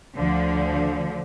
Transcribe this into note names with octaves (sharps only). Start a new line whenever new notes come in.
D2 D3 F3